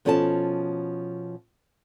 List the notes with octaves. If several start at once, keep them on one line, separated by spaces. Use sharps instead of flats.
B2 F3 C#4 A4 C#5 A5